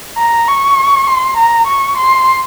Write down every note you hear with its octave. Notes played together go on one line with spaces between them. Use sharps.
A#5
C#6
C6
A#5
C#6
C6